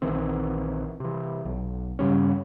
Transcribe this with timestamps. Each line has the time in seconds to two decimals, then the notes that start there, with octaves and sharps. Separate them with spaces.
0.02 A#1 D#3 E3 C4
1.00 C3 E3
1.45 B1
1.99 G2 C#3 G3 C#4